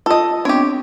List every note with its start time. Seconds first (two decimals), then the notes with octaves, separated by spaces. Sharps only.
0.06 F4 A4 D#5
0.45 B3 C4 D4 G4 C#5